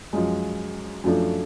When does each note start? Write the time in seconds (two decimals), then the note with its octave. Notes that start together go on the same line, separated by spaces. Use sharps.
0.13 F#2 F3 G#3
1.04 F#2 F3 A3 D4